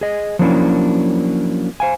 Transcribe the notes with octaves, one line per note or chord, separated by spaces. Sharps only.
G#4 D#5
F3 F#3 A#3 C#4 D4 E4
C5 F5 G#5